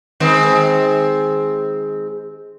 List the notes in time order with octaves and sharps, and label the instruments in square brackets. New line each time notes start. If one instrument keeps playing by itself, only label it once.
[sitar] D#3 G#3 C4